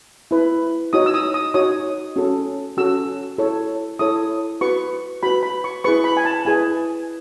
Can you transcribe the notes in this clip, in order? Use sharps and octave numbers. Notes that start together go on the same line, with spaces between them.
E4 B4
D#4 F#4 C#5 D#6
E6
D#6
D#6
D#4 F#4 C#5 D#6
C#4 F#4 A4
C#4 F#4 A4 E6
E4 A4 C#5
E4 A4 C#5 D#6
F#4 B4 C#6
F#4 B4 B5
B5
C#6
E4 G#4 B4 C#6
B5
G#5
A5
E4 G#4 B4 G#5